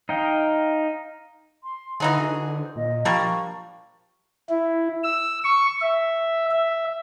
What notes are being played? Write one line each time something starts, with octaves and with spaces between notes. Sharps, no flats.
D#4 F5 G5
C6
D3 E3 D#4 G#4 F#5
D3 F#4
C5
A#2 D#5
F3 G3 A#3 D4 C#6
E4
E6
C#6
E5
E5